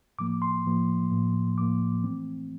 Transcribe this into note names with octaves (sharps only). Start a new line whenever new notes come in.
A2 F3 A#3 D6
C6
A2 F3 A#3
A2 F3 A#3
A2 F3 A#3 D6
E3 A3 C4